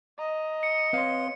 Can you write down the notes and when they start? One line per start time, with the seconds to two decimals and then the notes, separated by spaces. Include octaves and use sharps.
0.19 D#5 A#5
0.63 C#7
0.93 C4 B4 C#5 F5 C6